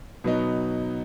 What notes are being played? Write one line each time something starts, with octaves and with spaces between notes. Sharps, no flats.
B2 F#3 B3 D#4